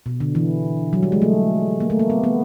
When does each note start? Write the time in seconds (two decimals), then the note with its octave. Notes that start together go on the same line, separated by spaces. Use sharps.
0.06 B2
0.20 D3
0.35 E3
0.93 F#3
1.03 G3
1.12 G#3
1.22 A3
1.80 A#3
1.90 A3
1.99 A#3
2.10 B3
2.24 B3